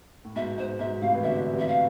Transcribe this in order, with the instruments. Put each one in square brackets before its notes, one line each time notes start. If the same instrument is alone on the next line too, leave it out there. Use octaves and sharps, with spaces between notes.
[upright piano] A2
[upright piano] G#2 B2 [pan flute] E5
[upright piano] G#2 [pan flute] C5
[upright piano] G#2 B2 [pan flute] E5
[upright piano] A2 C3 [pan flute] F5
[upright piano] E3
[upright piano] B2 D3 [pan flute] E5
[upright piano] C3 E3
[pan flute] E5
F5